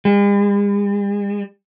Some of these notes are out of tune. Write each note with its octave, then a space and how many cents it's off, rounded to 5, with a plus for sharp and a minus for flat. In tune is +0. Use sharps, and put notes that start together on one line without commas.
G#3 -45